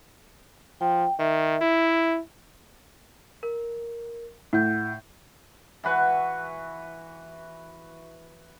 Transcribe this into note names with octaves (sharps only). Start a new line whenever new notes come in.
F3 G5
D#3 E5
E4
A#4
A2 F#5 G6
E3 F#4 B4 C#6